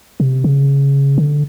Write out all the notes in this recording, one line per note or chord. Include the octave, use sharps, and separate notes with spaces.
C3
C#3
D3